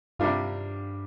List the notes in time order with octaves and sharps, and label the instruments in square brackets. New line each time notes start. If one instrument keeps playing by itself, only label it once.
[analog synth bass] G2 [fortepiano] C3 G3 D4 F4